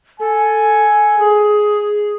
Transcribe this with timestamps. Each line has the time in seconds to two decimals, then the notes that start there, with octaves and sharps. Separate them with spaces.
0.20 A4 G#5
1.19 G#4